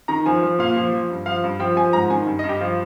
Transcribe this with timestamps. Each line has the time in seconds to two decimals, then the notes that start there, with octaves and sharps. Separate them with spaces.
0.08 D#3 A#5
0.26 F3 G#5
0.43 F3
0.59 A#2 F5
0.76 F3
0.93 F3
1.10 G2
1.26 F3 F5
1.44 G2
1.60 F3 G5
1.77 F3 G#5
1.93 G#2 A#5
2.10 D#3 G#5
2.27 G2
2.39 D#5
2.44 G2
2.49 G4
2.61 F3 F4